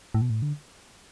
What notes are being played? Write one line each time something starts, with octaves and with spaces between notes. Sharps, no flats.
A2
B2
A2
D3